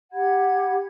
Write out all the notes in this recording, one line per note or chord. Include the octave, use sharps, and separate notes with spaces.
G4 F#5 B5 G#6